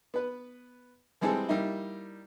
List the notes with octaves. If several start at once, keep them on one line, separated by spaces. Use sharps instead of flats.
B3 B4
E3 G3 G#3 C4 G#4 A4
G3 A#3 D#4 E4